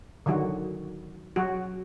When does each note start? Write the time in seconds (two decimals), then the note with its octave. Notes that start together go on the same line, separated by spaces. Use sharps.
0.26 D3 D#3 F#3 F#4
1.36 F#3 F#4